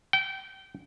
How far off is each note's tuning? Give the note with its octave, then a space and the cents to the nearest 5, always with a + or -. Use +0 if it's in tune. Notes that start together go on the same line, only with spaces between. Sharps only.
G5 -25